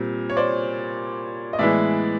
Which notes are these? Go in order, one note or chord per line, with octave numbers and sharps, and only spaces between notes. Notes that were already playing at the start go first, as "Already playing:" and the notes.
Already playing: A#2 G3 C4
C#5
C5 D5
D#5
A2 E3 G#3 B3 E4 D5 E5